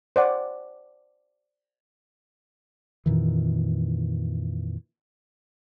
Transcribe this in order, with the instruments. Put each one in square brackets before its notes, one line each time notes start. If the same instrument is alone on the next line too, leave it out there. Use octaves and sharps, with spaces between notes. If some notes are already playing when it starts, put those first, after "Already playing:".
[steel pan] C5 D5 F#5
[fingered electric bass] F2 A#2 D#3 E3